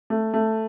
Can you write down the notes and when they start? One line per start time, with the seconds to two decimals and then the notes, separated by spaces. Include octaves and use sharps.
0.10 A3
0.34 A3